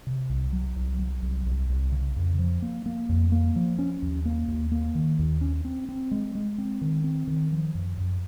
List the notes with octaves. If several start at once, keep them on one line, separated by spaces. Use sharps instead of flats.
C3
C2
F#3
C2
F#3
C2
C2
C2
C#3
F2
F3
A#3
A#3
F2
A#3
F3
C#4
D#2
A#3
D#2
A#3
D#3
D#2
C#4
C4
C4
G#3
G#3
C4
D#3
C4
D#3
F3
F#2
F#2